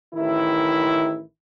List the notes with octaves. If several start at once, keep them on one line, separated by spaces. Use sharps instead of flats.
A1 D#3 E4